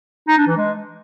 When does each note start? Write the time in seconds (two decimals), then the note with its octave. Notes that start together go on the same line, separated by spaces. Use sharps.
0.28 D#4
0.37 D4
0.47 E3
0.57 G#3